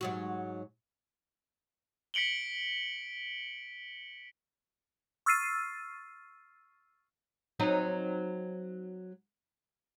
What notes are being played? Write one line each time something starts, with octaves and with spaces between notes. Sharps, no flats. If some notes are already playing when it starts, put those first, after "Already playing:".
G#2 F#3 F#4
B6 C#7 D7 F#7 G7
C#6 E6 F6 A6 C7 D#7
F#3 C4 D#4